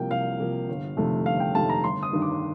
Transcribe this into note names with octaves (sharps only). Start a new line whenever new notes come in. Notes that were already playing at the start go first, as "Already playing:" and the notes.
Already playing: C2 C3 F3 A#3 G5
C2 F5
C3 F3 A#3
G1
F2 C3 D#3 A3
G1 F5
G5
F2 C3 D#3 A3 A5
A#5
G1 C6
D#6
G2 D#3
D6